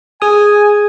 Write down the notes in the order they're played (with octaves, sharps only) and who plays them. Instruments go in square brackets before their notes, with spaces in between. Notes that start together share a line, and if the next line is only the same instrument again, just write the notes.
[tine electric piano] G#4 D#6 [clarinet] G#5